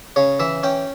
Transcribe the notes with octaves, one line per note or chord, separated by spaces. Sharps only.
C#3 C#5
E3 E5
C#4 G5